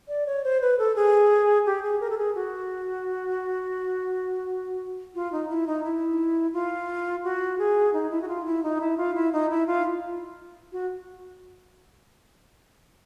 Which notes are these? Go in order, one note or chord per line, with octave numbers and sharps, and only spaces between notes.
D5
C#5
C5
B4
A4
G#4
G4
G#4
A#4
A4
G#4
F#4
F4
D#4
E4
D#4
E4
F4
F#4
G#4
D#4
E4
F#4
F4
E4
D#4
E4
F4
E4
D#4
E4
F4
F#4